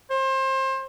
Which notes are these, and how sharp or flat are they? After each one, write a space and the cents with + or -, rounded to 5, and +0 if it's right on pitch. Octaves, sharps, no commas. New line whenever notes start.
C5 +30